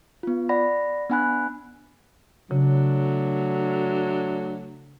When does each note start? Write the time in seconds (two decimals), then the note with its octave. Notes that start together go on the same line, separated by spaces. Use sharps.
0.23 B3 F4
0.49 D5 F#5 B5 A#6
1.10 B3 D4 F#5 G#5 B5 F#6
2.51 C#3 F#3 A3 D4